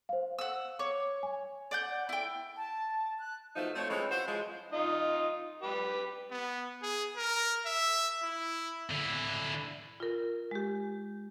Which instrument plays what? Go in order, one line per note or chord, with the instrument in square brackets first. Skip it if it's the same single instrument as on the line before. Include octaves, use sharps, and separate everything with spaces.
[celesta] C5 F5
[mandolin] F#5 E6
[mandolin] C#5 [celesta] D6
[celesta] G#5
[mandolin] D5 F#5 G6
E4 G5
[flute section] A5
F#6
[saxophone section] B2 F3 A3 B3 D#4
A3 C4 C5 C#5
E3 F3 G#3 C4 C#4
E4 F#4 C5
F3 G#3
[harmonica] D#4 F4 D#5
G4 B4
[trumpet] B3
G#4
A#4
E5
E4
[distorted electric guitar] D3 E4
[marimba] F4 A#4
G#3 G4